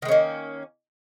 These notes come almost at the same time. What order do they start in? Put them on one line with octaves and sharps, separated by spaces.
D#3 G#3 C#4 A#3